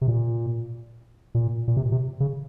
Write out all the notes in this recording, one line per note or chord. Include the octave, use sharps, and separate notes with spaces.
C3
A#2
A#2
A#2
C3
C3
C#3